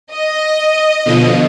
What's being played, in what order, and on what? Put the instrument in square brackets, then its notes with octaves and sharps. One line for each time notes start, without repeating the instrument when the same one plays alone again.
[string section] D#5
[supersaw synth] B2 D3 F3